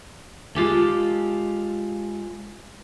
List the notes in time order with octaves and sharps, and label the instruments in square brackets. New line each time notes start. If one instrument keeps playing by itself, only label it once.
[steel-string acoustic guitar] G#3 F4 G4 A4